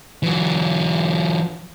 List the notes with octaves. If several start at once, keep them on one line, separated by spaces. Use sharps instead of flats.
E3 F#3